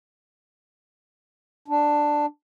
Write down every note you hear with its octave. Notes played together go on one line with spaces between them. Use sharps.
D4